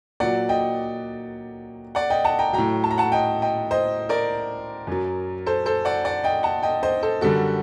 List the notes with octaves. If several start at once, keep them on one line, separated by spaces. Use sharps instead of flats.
A#2 F#3 D5 F#5
D#5 G5
D5 F#5
D#5 G5
F#5 A5
G5 A#5
A2 F#3 G5 A#5
A5
A#5
F#5 A5
D#5 G5
D#5 G5
C5 D#5
A#4 D5
F#2 F#3
A4 C5
A4 C5
D5 F#5
D5 F#5
D#5 G5
F#5 A5
D#5 G5
C5 D#5
A4 C5
F#2 D3 G3 F#4 A4